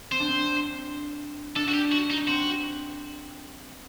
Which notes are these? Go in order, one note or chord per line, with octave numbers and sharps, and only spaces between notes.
C4 C5
D4
C4
D4 A4
F#4
G4
F#4
D#4
C4 F#4